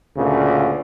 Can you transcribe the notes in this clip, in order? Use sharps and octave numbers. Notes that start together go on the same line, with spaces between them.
D2 A#2 C#3